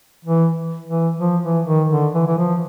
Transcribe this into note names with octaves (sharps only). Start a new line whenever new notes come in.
E3
E3
F3
E3
D#3
D3
E3
E3
F3